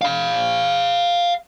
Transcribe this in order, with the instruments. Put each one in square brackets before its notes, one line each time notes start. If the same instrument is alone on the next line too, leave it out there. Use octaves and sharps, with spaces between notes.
[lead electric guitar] F5 B5